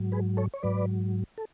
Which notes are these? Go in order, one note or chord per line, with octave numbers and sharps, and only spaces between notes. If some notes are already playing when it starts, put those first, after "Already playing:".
Already playing: G#2 F#3
G#4 B4
A4 C#5
C#5
G#2 F#3 B4 D5
A4